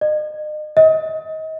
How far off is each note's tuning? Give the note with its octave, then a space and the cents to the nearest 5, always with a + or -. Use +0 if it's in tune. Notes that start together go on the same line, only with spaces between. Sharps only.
D#5 -40
D#5 +30